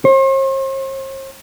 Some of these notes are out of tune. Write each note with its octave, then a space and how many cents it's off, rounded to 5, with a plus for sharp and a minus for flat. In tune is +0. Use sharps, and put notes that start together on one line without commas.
C5 +45